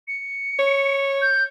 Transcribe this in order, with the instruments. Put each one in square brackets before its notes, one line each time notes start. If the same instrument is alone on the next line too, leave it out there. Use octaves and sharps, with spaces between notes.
[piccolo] C#7
[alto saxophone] C#5
[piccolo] G6